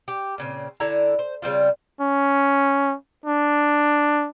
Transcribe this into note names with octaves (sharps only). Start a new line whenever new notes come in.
G4
A#2 C#3 C4
D3 E4 A4 A#5
C5
C#3 G3 C4 F4
C#4
D4